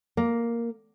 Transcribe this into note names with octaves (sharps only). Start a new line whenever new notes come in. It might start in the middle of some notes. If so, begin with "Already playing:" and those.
A#3